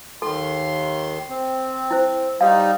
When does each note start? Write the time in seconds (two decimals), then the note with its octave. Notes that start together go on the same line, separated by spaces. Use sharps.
0.22 D#2 D#3 A4 C6
1.30 C4
1.91 E4 C5
2.41 G3 D#4 G4 C#5 F5